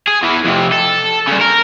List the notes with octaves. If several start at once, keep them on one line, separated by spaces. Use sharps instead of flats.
G#4
E2 E3
F2 C3
A4
G2 C#3
A#4